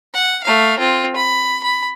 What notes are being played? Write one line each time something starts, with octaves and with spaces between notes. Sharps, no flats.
F#5
A3 F5
C4 F4
B5
B5